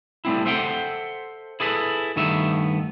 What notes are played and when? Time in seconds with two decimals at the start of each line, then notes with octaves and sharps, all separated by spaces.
0.25 G3 A3 C4 E4
0.45 A4 C5 E5 F#5 G5
1.60 E4 G#4 A4 B4
2.16 G2 D#3 A3 B3 E5